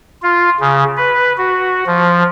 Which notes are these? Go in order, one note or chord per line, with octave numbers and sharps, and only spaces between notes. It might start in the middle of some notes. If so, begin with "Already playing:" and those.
F4
C#3
B4
F#4
F3